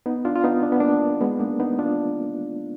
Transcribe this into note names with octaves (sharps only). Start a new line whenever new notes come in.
B3 D#4
D4 F4
F4
B3 D#4
D4
B3
A#3 D4
G#3 B3
A#3 D4
B3 D#4
D4 F4